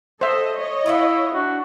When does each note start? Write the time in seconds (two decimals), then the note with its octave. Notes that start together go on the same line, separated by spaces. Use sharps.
0.21 A4 C5 D#5 E5
0.57 C#5 D#5
0.86 E4 F4 F5 F#5
1.34 D4 F#4